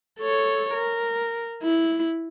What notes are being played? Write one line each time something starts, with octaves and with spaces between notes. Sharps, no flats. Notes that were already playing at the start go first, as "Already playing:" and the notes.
A4 C#5
A#4
E4